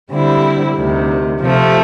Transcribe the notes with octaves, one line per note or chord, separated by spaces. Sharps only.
D3 G3 C4 E4
D2 C3 D#3
C3 F3 A3